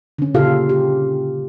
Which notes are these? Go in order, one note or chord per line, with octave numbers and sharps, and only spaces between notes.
D3 C#4
A#2 C#3 F4 G4 A4 F5
G4